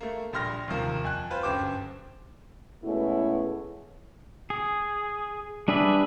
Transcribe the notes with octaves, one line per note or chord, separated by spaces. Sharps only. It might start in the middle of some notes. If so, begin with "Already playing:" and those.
A3 A#3
A#1 G3 C6 F6 A#6
D#2 C3 F3 A#3
F2 G#5 F#6
F4 B4 C5
G1 F#2 G4 C5 D6
B2 G#3 A3 B3 C#4 E4
G#4
G3 D4 G#4 B4 E5